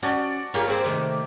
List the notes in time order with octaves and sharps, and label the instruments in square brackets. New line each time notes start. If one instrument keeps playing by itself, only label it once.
[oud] C#4 [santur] F#4 D5 A5
[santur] A#3 G4 A#4 [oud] F4 G#4 C#5
[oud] C4 G#4 C5
C3 D#3 A3